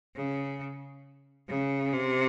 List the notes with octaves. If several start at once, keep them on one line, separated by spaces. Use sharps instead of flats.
C#3
C#3
C3